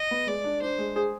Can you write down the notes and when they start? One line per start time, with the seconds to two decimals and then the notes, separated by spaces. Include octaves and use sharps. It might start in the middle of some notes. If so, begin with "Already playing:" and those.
Already playing: D#5
0.11 B3
0.27 G#3 D5
0.44 D4
0.62 D4 C5
0.78 G#3
0.96 G#4